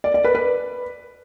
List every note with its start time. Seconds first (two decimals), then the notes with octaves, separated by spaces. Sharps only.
0.04 D5
0.14 D5
0.24 B4
0.35 B4